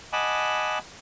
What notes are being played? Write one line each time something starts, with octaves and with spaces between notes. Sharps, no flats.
D#5 F#5 G#5 A5 B5 D6